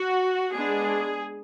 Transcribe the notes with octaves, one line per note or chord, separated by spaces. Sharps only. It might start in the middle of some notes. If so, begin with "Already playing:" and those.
Already playing: F#4
G#3 B3 D4 G#4